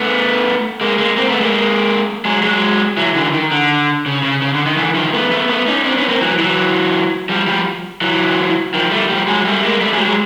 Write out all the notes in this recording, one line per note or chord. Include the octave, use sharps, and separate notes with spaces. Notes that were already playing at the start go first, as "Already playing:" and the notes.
Already playing: A3 B3
G#3 A#3
G#3 A#3
A#3 C4
A3 B3
G#3 A#3
F#3 G#3
F#3 G#3
E3 F#3
D3 E3
D#3
D3
C#3
C#3
C#3
D3
D#3
D3 E3
D#3 F3
A3 B3
A3 B3
A3 B3
C#4 D#4
C4 D4
B3 C#4
A#3 C4
E3 F#3
E3 F#3
F3 G3
F3 G3
E3 F#3
D#3 F3
G3 A3
F3 G3
F#3 G#3
G3 A3
G#3 A#3
G3 A3
F#3 G#3
G3
F#3 G#3